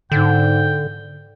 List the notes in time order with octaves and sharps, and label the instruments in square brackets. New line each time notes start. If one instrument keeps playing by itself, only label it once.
[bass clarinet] G#2 [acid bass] D3 [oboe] G5